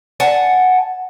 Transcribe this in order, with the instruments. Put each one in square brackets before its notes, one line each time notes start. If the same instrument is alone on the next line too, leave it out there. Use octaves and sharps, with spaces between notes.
[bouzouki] F#5 G#5 A5